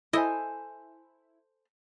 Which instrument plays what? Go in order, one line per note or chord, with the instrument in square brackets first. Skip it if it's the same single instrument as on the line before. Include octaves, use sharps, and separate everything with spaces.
[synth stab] E4 [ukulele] A4 C5 G#5 [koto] D#5